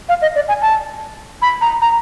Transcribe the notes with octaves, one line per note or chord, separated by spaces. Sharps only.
F5
D#5
D5
G#5
A5
B5
A#5
A#5